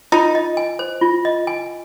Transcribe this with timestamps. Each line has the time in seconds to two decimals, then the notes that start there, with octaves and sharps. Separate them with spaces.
0.12 D#4 F4
0.35 D#5
0.57 G#5
0.79 C5
1.01 F4
1.25 D#5
1.47 G#5